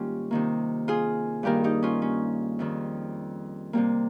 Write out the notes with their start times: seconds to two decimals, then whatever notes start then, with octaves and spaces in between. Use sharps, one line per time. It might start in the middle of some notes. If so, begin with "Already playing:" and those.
Already playing: G#2 D#3 G3 A#3 C#4 F4 G4
0.31 C3 D#3 A#3
0.88 F4 G#4
1.43 G2 D#3 G3 A#3 G4 A#4
1.64 D#4 G4
1.83 C#4 F4
2.02 C#4
2.59 F2 D#3 G3
3.73 C3 G3 A#3